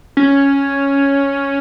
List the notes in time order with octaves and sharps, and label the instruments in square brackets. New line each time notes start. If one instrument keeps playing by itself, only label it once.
[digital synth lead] C#4